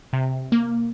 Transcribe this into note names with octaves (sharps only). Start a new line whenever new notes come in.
C3
A#3